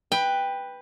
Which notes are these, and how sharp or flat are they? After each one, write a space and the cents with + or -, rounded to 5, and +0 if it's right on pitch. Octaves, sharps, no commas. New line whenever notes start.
B4 +0 G5 +15